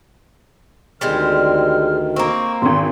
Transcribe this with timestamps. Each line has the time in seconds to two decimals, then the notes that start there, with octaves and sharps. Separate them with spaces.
1.01 D2 D#3 G3 G#3 C4 F6
2.16 A#3 C4 C#6
2.62 G#1 E2 C6